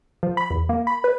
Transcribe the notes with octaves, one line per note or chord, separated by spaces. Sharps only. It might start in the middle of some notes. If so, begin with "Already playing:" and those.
F3
B5
E2
A#3
B5
B4